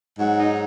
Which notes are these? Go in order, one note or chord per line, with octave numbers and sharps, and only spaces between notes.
G#2 F#3 F#4
D#4